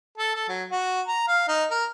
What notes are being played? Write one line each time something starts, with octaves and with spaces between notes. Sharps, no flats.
A4
A4
F#3
F#4
A#5
F5
D#4
A#4